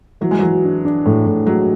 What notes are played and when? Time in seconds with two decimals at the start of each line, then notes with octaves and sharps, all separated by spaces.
0.21 E3 F#3
0.31 G#3
0.39 E3 F#3
0.64 D4
0.85 D4
1.06 A2
1.26 A2
1.46 F#3 G#3